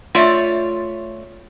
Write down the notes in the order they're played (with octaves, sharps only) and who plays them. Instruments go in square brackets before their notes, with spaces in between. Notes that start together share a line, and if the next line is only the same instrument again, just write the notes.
[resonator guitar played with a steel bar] A3 F4 C#5 D5 E5